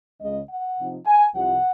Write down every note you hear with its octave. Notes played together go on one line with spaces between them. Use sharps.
C#2 C#3 G#3 D#5
F#5
C3 F3 C4 D#4
G#5
C2 C3 F3 F#5